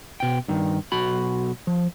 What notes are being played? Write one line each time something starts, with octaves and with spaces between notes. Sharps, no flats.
B2 G5
G2 D#3
B1 F#4 B5
F3